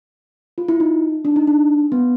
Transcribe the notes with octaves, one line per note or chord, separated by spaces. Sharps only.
F4
E4
D#4
D4
D#4
D4
B3